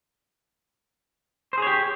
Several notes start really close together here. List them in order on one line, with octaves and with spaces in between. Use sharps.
C5 G#4 C#5 G4